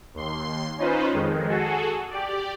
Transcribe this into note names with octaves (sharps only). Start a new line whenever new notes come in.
D#2 C6
C#4 D#4 F4 B4 C5
F2 D#3 G#3
F#4 G#4 A4
G4 D5